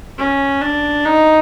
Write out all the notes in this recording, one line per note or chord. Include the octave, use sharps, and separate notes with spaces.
C#4
D4
D#4